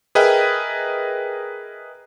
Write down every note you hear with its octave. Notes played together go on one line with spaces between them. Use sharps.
G#4 A#4 B4 D#5 E5 G5